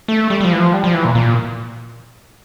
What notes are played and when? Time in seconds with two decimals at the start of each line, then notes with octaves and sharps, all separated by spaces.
0.08 A3
0.30 G3
0.41 G3
0.44 F3
0.53 E3
0.58 F3
0.73 G3
0.84 F3
0.94 E3
1.05 A#2
1.15 A#2